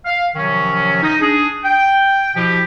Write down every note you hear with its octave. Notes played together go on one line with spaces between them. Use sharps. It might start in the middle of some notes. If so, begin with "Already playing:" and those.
F5
C3 D#3 F3 F#3 C#4
D#4
D4 G#4
G5
B2 F3 E4 G4